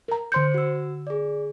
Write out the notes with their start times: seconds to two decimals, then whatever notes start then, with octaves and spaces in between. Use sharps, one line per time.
0.08 A#4 A#5
0.32 D3 C5 C6 G6 C#7
0.54 F#4 E6
1.07 G#4 D5